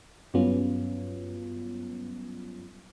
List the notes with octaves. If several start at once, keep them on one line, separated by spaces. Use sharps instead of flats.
G2 F#3 G3 B3 C#4 F4